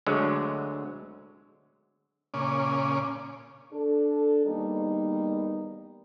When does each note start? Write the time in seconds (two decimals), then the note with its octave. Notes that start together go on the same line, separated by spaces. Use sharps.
0.06 D2 D3 F#3 G#3
2.34 A#2 C#3 C#4 D6
3.73 D4 A4
4.46 E2 D#3 G3 A#3 B3 D#4